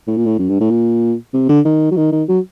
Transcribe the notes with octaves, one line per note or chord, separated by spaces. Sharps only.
A2
A#2
A2
F#2
G2
A2
A#2
C3
D3
D#3
F#3
D#3
D#3
F#3